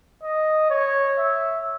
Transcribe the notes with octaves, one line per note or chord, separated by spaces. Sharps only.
D#5
C#5
E5